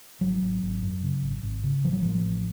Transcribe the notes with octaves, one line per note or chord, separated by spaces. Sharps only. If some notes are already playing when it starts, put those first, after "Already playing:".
G#1 F#3
G#1
G#1
F#2
C#3
G#1
G#1
C#3
A1 F3
F#3
A2 F3
A1